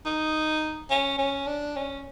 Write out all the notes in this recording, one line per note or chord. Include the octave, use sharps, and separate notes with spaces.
D#4
C#4
C#4
D4
C#4